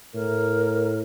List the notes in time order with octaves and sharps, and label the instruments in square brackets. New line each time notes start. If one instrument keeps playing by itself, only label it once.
[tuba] A2 [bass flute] A#4